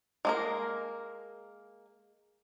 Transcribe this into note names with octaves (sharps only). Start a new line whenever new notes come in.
G#3 A#3 A#4